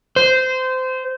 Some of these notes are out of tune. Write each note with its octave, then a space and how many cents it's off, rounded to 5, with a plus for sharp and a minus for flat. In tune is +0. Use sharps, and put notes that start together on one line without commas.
C5 -20